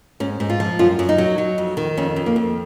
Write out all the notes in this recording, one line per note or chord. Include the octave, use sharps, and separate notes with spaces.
G#2 C#4
G#2
F4
F3
F#2 F4
F#2
D#4
F#3
F#3
F2
D#3
F2 C#4
F2
A#3
F2